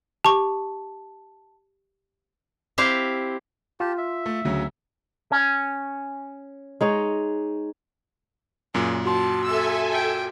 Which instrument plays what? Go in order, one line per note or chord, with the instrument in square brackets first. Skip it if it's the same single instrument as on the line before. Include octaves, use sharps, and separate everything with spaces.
[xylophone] G4 C#6 [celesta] A5
[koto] C4 E4 G4 F5
[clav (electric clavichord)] F4 [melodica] G4 A5
[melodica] E5
[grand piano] A3
D2 C#3 F#3
[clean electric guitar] C#4
[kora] G#3 D#4 C#5
[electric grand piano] F#2 A#2 [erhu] G#4
[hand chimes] F#4 C6 [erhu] A5
[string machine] A4 E5 G#5 [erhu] E6
[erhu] G5